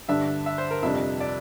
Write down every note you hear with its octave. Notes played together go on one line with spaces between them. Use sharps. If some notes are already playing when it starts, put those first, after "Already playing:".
G2 D3 G3 D4 E5
E5
C5
A#4
F2 C3 G3 D4 E5
D5